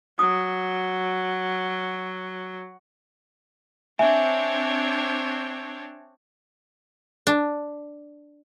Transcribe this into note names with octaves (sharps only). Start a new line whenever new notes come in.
F#3 D#6
C4 D4 C#5 E5 G#5
D4